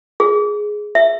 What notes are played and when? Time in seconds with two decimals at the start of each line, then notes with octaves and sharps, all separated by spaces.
0.20 G#4
0.95 E5